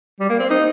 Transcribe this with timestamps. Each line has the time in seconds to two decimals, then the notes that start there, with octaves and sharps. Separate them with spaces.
0.20 G3
0.29 A#3
0.39 C4
0.50 D#4